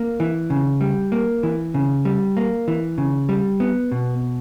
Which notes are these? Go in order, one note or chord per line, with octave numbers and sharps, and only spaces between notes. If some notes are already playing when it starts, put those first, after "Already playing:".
Already playing: A#3
E3
C#3
G3
A#3
E3
C#3
G3
A#3
E3
C#3
G3
B3
B2